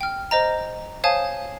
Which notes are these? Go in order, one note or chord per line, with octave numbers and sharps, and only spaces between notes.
G5 F6
C5 D#5 A#5
C5 C#5 F5 G#5 A5 D#6